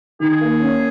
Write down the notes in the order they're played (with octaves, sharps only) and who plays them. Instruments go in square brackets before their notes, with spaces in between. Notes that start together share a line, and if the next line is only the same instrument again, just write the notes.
[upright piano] D#3 [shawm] G#4
[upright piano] A#3
C#4